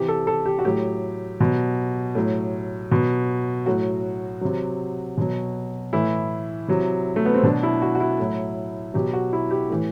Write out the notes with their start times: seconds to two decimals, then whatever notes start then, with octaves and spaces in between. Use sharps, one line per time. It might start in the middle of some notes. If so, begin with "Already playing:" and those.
Already playing: C3 E3 G4
0.08 A4
0.27 A4
0.46 G4
0.59 F#4
0.65 A2 F#3 G4
1.40 B2 F#3
2.15 A2 F#3
2.91 B2 F#3
3.66 A2 F#3 F#4
4.41 C3 F#3
5.17 B2 F#3
5.93 A2 E3 E4
6.68 C3 F#3
7.16 A3
7.25 B3
7.34 C4
7.43 B2 F#3 D4
7.63 E4
7.82 F#4
7.95 F#4
8.00 E4
8.19 A2 F#3
8.94 B2 F#3 G4
9.13 F#4
9.33 E4
9.51 G4
9.70 A2 E3